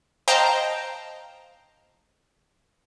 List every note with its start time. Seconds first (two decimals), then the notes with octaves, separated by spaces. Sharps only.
0.28 C5 D#5 F5 G5 A5 A#5